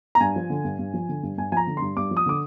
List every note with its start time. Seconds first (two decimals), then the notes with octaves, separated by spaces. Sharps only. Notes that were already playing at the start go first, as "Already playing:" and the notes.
0.15 A#5
0.20 G2 G#5
0.36 F3
0.50 D3
0.64 G2
0.79 G2
0.94 F3
1.09 D3
1.23 G2
1.37 G2 G#5
1.52 F3 G#5
1.57 A#5
1.67 D3
1.77 G2 C6
1.96 G2 D6
2.11 F3
2.17 D#6
2.26 D3 D6